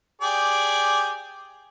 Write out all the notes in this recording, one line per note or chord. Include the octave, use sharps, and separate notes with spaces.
G4 G#4 D5